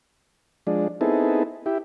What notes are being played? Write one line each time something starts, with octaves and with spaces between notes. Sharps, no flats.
F3 G#3 D4
B3 C4 D#4 E4 G#4 A4
E4 G4